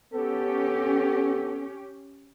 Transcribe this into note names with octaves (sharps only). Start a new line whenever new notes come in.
B3 C#4 G4 A4